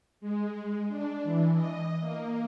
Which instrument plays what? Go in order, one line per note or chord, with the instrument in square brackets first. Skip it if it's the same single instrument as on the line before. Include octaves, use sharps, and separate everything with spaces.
[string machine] G#3
D4
E3
D#5
A#3